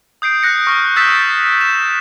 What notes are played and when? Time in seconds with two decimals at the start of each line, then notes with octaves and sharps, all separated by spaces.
0.22 D#6 G6 C7 D7
0.43 F#6 A#6 C#7
0.67 C#6 F6
0.96 D#6 E6 G6 A6 B6 E7
1.61 E7